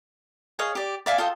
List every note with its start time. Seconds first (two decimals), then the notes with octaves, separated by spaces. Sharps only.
0.59 G#4 C#5 D#5 F5
0.75 G4 D5
1.06 D5 E5 F5 G#5
1.18 F4 A4 D#5 G5